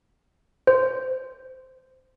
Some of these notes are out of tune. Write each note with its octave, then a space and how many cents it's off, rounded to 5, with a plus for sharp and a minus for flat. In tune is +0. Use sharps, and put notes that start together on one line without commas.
C5 -15